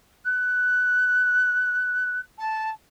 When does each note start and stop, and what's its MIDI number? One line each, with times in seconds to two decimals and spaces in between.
0.25 2.19 90
2.38 2.70 81